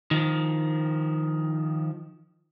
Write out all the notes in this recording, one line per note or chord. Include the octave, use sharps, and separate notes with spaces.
D#3 F3